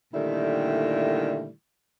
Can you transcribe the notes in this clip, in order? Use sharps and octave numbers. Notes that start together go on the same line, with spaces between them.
A#2 D3 D#3 G3 A3 E4